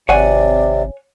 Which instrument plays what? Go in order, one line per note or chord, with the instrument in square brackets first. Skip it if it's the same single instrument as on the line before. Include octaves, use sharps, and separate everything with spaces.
[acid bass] G#1 [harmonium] C3 [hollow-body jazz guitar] C#5 F#5 G#5 [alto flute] D5